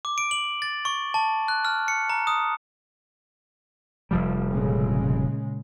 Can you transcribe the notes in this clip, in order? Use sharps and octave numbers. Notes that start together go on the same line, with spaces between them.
D6
D7
F#7
A6
C#6
A5
F#6
F6
C#7
A#5
D#6
F1 F3 G3
A#2 C#3 G#3